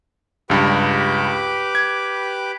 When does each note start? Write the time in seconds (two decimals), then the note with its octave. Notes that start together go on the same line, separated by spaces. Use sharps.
0.50 C#2 G2 G4 B4 D6
1.75 G#6